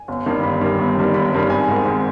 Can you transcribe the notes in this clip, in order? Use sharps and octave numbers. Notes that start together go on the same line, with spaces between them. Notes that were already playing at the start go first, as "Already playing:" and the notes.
Already playing: G#5
G1
G2 D#3 G3
G1 B5
G2 D#3 G3
G1
G2 D#3 G3
G1 B5
G2 D#3 G3
B5
G#1 G#5
G#2 D#3
G#1